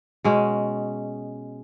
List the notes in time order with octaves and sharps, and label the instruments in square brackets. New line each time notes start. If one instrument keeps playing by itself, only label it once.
[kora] B2 G#3 C#4